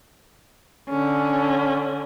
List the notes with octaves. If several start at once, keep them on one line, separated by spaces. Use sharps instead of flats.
D3 C#4